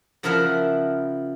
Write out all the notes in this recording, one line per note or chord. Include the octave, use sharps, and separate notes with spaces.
C#3 F3 E4 A#4 E5 F#5